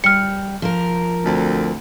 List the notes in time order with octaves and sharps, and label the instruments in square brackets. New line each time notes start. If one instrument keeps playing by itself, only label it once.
[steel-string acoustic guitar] G3 [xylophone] F6 C#7
[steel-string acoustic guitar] F3 A#4
[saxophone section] D2 C4